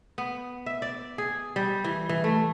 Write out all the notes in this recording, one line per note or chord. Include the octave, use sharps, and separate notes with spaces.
B3
E5
D5
G#4
G3
E3
E3
A3